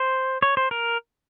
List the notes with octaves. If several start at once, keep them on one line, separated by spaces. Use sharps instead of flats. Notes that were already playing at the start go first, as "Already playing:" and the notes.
Already playing: C5
C#5
C5
A#4